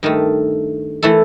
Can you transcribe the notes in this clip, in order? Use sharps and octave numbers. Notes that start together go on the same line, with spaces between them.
G2 D#3 A3
E3 A3 E4 A4